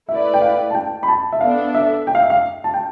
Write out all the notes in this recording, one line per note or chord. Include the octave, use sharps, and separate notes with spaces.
A3 E4 B4 D5 E5
G5
F5
A5
G5
B5
A5
E5
B3 D4 A4 F5
E5
G5
F5
E5
F5
A5
G5